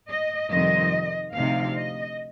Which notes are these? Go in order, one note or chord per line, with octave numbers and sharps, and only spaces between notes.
D#5
F2 C3 D#3 G3 C4 D#5
D2 C3 F3 C4 D#4 F5
D#5